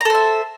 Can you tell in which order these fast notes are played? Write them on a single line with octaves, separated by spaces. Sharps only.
A#5 A4 C5 E5